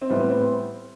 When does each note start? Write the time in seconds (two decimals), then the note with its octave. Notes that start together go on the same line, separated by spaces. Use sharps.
0.02 C4
0.09 A2 E3 G3 B3
0.21 C4
0.31 C4